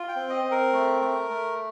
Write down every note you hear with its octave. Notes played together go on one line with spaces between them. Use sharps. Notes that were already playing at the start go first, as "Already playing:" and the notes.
Already playing: F4
G5
C4
D#5
C4
A#4
A3
A3
A3